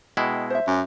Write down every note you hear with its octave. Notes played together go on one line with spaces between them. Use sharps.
B2 G#3 E4 G5
C5 E5
F#2